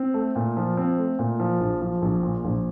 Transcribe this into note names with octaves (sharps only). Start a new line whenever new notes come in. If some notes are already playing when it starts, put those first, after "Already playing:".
Already playing: C4
A3
A#2
F3
C4
A3
A#2
F3
A#1
F3
A#1
A#2
A#1